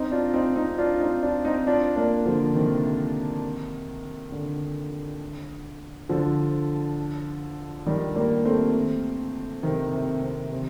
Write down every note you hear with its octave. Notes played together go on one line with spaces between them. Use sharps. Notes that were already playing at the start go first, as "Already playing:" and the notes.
Already playing: C4 D#4
D4 F4
C4 D#4
C4 D#4
D4 F4
C4 D#4
D4 F4
C4 D#4
D4 F4
A#3 D4
D3 F3
C3 D#3
D3
D3 F3
D#3 G3
G3 A#3
A3 C4
C3 D#3
C3
C3
C3